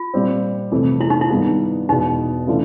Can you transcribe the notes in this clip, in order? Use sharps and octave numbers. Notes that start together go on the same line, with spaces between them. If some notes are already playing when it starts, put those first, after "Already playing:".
Already playing: F4
A#2 G3 C4
F2 C3 E3 A3
E4
D#4
E4
G2 D#3 G#3 B3
E2 B2 G#3 D#4
C#3 E3 A3 D4 F4